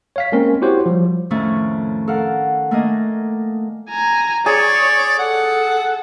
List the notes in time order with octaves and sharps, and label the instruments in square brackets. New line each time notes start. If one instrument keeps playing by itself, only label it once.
[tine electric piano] C#5 F5 B6
G#3 A#3 C4 C#4 A#4
E4 F#4 G4 C5 C#5
F3 G3
[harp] F2 A2 D#3 A3 C#4 C#5
A4 A#4 F5 F#5
A3 A#3 D4 D#5 G#5
[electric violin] G#5 A#5
[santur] G#4 [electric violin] C#5 [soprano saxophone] D5
[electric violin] A4 [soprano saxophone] F#5